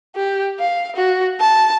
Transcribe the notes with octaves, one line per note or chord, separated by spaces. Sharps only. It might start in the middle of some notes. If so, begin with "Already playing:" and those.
G4
F5
F#4
A5